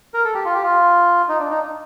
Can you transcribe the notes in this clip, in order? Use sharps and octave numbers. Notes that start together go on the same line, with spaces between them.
A#4
A4
G4
F4
G4
F4
D#4
D4
D#4